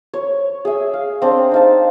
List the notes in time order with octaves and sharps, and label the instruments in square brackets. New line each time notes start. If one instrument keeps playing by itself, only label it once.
[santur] C#5
G#4 E5
F5
C4 D4
D#4 F5 A5